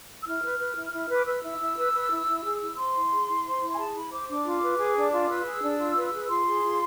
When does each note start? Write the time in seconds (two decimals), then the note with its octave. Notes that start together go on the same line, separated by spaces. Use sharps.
0.22 E6
0.26 E4 F6
0.42 B4
0.59 B4
0.76 E4
0.92 E4
1.10 B4
1.16 D6
1.26 B4 E6
1.44 E4
1.60 E4
1.77 B4
1.93 B4
2.10 E4
2.27 E4
2.44 G#4
2.61 E4
2.77 C5 C6
2.94 E4
3.11 G#4
3.27 E4
3.45 C5
3.60 E4
3.74 G#5
3.77 G#4 A5
3.95 E4 B5
4.12 C5 D6
4.28 D4 D6
4.45 F4
4.61 B4
4.78 G#4
4.95 D4
5.11 F4
5.29 B4 E6
5.45 G#4
5.62 D4
5.79 F4
5.96 B4
6.13 G#4
6.29 F4 C6
6.46 G#4
6.62 F4